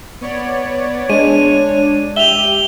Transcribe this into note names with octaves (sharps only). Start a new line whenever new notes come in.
B3 C#5 D5
G#3 D4 C#5 D#7
G4 E5 F7 G7